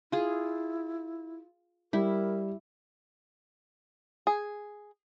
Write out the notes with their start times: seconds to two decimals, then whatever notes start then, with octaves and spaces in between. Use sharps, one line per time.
0.12 E4 F4 G#4
1.93 G3 E4 A#4
4.27 G#4